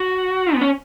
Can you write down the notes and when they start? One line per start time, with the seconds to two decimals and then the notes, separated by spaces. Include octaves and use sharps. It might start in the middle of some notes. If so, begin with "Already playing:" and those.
Already playing: F#4
0.54 B3
0.61 C#4